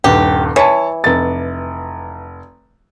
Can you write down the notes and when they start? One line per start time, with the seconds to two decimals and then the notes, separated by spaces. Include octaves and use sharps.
0.04 D#1 G2 G4
0.56 E3 C#5 A5
1.04 F1 A6